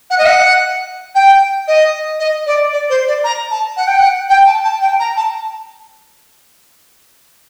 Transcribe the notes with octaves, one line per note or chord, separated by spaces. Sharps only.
F#5
D#5
F#5
G5
D#5
D#5
D5
D5
C5
D5
A#5
A5
F#5
G5
F#5
G5
A5
A5
G5
A#5
A5